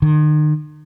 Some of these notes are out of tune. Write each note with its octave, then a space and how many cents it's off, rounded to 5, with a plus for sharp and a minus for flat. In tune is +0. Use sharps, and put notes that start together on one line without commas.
D#3 -40